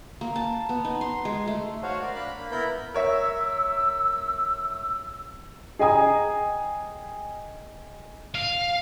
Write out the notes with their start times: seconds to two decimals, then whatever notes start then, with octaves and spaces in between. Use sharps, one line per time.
0.21 A#3
0.36 A5
0.69 B3
0.85 D#4
1.01 C6
1.25 G#3
1.47 A3
1.83 F#4 C5 C#5 F5 F#5
2.02 A#4 D5 F5
2.15 D4 F5 B5 F#6
2.39 A#3 B5
2.51 B3 E4 A#4 B5 G6
2.94 A#4 C#5 E5 E6
5.79 G#4 D#5 G5 G#5 A#5 D#6
8.34 F5